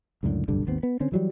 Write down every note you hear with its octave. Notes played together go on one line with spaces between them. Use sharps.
C#2 F#2 A2 D3
F1 B1 G2 D3
G#1 D#2 B3 C4
B3
D3 C4 C#4
E3 F#3 G3